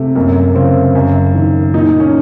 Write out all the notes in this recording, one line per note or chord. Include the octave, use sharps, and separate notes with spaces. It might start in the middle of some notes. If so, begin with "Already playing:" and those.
Already playing: C3 A3
F#2 A#3
C#3 C4
F#2
D#3
A#2 D#4
C#4